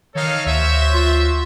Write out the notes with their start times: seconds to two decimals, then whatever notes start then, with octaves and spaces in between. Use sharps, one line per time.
0.15 D#3 D#4 A4 C#5 F5
0.46 D2 F#4 C5 C#5 E5
0.94 F4